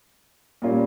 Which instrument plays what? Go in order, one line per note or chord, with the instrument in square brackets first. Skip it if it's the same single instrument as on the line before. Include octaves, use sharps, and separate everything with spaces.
[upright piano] A#2 G3 A#3 C#4 F4